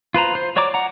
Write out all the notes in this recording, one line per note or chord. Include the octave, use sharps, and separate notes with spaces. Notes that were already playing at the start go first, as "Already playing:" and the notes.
F4 B4 C5 A#5
C5
F#4 C#5 D5 A#5 D6
F#5 A#5